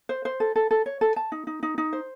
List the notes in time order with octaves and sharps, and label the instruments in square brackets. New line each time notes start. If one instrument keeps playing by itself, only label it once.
[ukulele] C5
C5
A4
A4
A4
C#5
A4
A5
D#4
D#4
D#4
D#4
C5